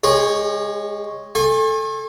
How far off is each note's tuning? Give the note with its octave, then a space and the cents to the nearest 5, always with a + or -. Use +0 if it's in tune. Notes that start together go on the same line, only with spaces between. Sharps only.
G#3 +0 G4 +45 C#5 +0
A4 +0 G#5 -30 C#6 -45